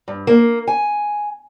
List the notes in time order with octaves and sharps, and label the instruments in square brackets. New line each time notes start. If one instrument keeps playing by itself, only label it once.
[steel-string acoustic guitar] G2
A#3
G#5